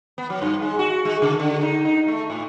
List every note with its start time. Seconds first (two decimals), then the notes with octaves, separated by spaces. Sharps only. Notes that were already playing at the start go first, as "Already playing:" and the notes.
0.18 B3
0.30 F#3
0.42 G2
0.62 G#3
0.79 F#4
1.05 G#3
1.22 C#3
1.39 D3
1.63 D#4
1.85 D#4
2.08 A3
2.30 A2